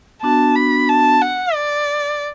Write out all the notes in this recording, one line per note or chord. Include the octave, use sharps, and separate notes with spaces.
B3 D4 F#4 A5
B5
A5
F#5
D5